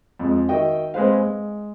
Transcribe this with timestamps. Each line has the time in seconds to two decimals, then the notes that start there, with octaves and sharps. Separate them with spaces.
0.19 F2 G#3
0.49 D#3 F#4 D#5 E5 G5
0.94 G#3 C4 B4 C5 F5
1.18 G#3